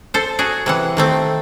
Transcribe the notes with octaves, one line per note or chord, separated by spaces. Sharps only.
A4 C5
F#4 G#4
C3 E3 F#5
D#3 A3 C4